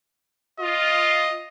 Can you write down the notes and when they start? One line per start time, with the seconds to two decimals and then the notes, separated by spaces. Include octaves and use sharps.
0.60 F4 D#5